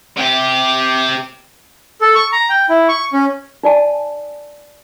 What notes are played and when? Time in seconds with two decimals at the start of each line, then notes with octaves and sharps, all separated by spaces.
0.17 C3 G4
2.01 A4
2.15 C#6
2.32 A#5
2.50 G5
2.69 E4
2.89 C#6
3.13 C#4
3.63 D#4 D5 G#5 A5